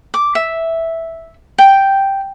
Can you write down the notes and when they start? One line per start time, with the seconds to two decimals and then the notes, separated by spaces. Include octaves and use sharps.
0.14 D6
0.35 E5
1.58 G5